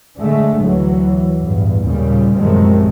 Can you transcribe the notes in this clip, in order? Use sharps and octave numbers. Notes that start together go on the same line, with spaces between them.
D3 G#3 A3
D2 E3 F#3
A1 E2 G2
D#2 A#2 C#3 G3
A#1 F#2 C3 D#3 G#3 A3